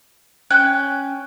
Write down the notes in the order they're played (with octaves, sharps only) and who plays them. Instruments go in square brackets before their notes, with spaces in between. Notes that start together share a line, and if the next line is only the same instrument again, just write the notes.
[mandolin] C#4 G5 F#6